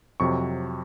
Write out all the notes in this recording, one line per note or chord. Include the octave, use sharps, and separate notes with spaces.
F2 C3 F#3 C#6